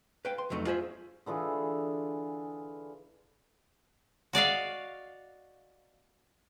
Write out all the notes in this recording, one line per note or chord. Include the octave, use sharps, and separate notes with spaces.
B4 F5 G5
C6
F2 F#3 A3 D4 D#4
F4 G#4 C5 D#5 E5
D3 E3 F4 G#4
F#4 D5 D#5 F5